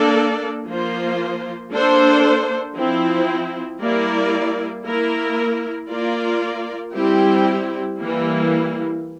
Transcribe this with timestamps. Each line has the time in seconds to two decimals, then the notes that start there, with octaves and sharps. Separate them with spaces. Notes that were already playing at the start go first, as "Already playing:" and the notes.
Already playing: A#3 D4 A4 D5
0.66 F3 A#3 F4 C5
1.70 A#3 D4 A4 C5
2.75 F3 C4 E4
3.80 G3 A#3 E4 A#4 D5
4.84 A#3 E4 A#4
5.89 A#3 F4 A#4 D5
6.94 G3 C4 E4 G4
7.99 E3 G3 A#3 E4